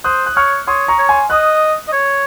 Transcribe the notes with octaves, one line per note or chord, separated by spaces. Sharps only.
C5 D#6 F#6
F#6
C#5 C#6 F6
C#5 C6 D#6
A#5 C#6
C#5
G#5 C6
D#5 D#6 F#6
D#5
C#5